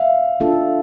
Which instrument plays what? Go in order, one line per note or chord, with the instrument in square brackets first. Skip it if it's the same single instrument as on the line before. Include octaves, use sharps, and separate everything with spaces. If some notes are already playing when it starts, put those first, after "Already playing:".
Already playing: [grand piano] E5 F5
[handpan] A3 D4 F4 A4